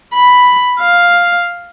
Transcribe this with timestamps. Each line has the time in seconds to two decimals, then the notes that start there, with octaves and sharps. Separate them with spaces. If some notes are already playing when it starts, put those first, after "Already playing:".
0.14 B5
0.81 F5